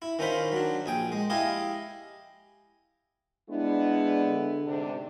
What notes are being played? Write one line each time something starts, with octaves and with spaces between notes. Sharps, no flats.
E4
D#3 C#4 F4 C5 B5
F#3 D4
A#1 G#4 G5
G#3
E4 G4 D#5 F5 G#5
G#3 B3 D4 E4
D3
G#2 C3 D4